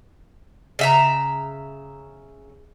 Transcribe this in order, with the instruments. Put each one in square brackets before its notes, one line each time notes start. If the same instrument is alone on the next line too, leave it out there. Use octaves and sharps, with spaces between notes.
[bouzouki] C#3 E5 A#5